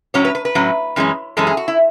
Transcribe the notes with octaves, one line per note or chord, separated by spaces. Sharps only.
A2 F#3 C#4 C#5
B4
B4
B4
A2 F#3 C#4
F#2 E3 G#3 C#4
F#2 E3 G#3 C#4 A4
G#4
F#4
E4